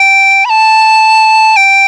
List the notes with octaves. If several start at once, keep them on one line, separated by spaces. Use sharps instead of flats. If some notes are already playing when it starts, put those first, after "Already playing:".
Already playing: G5
B5
A5
G5